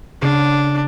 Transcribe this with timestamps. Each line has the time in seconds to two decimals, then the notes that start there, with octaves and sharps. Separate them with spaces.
0.22 C#3 D4 D6 C7